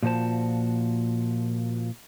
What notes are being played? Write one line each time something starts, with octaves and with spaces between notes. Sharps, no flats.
A#2 F3 F#4 C5 A5